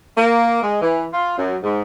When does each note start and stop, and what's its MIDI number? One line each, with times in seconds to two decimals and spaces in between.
0.17 0.59 58
0.62 0.77 56
0.82 1.06 52
1.13 1.33 65
1.37 1.56 42
1.63 1.82 44